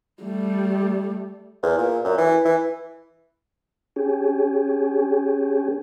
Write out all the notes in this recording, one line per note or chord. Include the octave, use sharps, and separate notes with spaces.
G3 A3
E2
A#2
F#2
E3
E3
C#4 G4 G#4